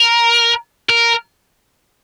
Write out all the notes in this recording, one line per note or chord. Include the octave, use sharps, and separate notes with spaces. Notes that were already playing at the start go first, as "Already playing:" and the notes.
Already playing: A#4
A#4